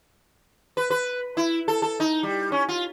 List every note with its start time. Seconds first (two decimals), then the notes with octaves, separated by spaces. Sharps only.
0.77 B4
0.90 B4
1.37 E4
1.68 A4
1.82 A4
2.00 D#4
2.23 G3
2.52 C#4
2.69 F4